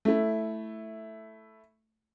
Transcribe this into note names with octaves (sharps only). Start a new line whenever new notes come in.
A3 E4